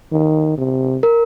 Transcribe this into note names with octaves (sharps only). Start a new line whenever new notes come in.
D#3
C3
A#4